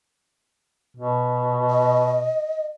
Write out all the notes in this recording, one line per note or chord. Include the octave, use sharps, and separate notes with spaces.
B2
D#5